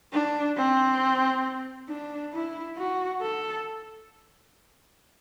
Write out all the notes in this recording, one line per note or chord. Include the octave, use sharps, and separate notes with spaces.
D4
C4
D4
E4
F#4
A4